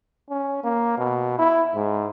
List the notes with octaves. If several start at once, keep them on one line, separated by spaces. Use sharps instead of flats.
C#4
A#3
B2
E4
G#2